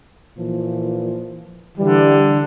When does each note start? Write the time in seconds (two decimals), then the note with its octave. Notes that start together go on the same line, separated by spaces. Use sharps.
0.37 A#2 E3 F3
1.78 D3 E3 G3